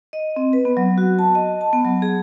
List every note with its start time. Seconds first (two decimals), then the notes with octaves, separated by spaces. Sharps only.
0.13 D#5
0.36 C4
0.53 B4
0.65 B3
0.77 F#3
0.98 F#4
1.19 A5
1.35 D#5
1.61 A5
1.73 B3
1.85 F#3
2.02 G#4